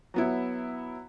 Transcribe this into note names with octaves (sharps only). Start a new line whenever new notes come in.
F#3 B3 E4